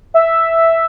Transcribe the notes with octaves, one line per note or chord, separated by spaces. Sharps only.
E5